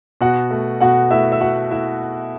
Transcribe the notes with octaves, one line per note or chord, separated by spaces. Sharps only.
B2 F#4 F#5
A3
B2 F#4 F#5
A3 E4 E5
E5
A3 F#4 F#5
A3 E4 E5